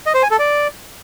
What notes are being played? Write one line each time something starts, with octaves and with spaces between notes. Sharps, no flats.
D#5
C5
G#5
A4
D5